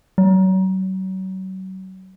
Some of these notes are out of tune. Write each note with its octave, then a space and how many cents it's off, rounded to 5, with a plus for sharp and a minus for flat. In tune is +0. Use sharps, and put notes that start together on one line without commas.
F#3 +35